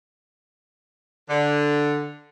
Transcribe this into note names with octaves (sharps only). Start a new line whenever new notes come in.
D3